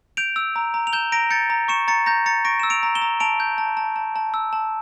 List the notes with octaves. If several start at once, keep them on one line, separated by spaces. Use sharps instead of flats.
G6 D7 F7
E6
A#5
A#5
F7
G6 E7 G7
A#5 A#6 D7
G6 A6 C#7
A#5
C#6 C#7 E7
A#5 A6 C#7
A#5 G6 A#6
A#5 A6 C#7
C#6 A#6 D7
E6 E7
D7 F7
A#5
E7 G7
A#5
A5 D7 F7
G6
A5
A5
A5
A5
E6
A5